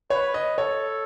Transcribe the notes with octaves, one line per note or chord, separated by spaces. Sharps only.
B4 C#5
D#5
A4 C#5